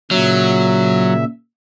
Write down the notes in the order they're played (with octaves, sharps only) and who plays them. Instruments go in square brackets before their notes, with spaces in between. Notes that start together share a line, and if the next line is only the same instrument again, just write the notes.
[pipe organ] A#2 C#3 E5 [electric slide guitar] F#3